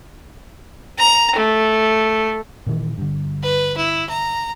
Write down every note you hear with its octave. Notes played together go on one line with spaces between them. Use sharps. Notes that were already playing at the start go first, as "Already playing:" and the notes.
A#5
A3
A#2 D#3 E3
G2 D3
B4
E4
A#5